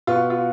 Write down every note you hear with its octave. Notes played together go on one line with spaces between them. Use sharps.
B2 B3 F4
F4